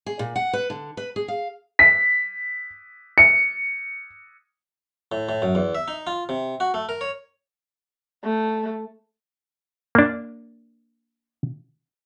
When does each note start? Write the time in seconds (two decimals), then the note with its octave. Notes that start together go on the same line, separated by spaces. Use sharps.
0.06 G#4
0.19 A#2
0.36 F#5
0.53 B4
0.70 D3
0.97 B4
1.16 G#4
1.28 F5
1.79 B6
3.18 C#7
5.12 A2
5.29 A2
5.42 F#2
5.55 E2
5.75 E5
5.88 D#4
6.07 F4
6.29 C3
6.60 F#4
6.74 A3
6.89 A#4
7.01 C#5
8.24 A3
9.95 A#3 D4